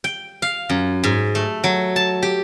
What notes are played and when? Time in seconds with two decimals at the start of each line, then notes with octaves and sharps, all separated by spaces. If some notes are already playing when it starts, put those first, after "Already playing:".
0.04 G5
0.42 F5
0.69 F#2
1.04 G#2
1.35 A3
1.64 F#3
1.96 A5
2.22 G4